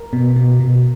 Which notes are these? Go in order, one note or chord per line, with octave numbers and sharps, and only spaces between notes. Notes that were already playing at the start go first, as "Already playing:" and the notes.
Already playing: A#4
B2
B2
B2